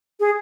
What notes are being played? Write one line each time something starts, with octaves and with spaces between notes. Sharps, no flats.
G#4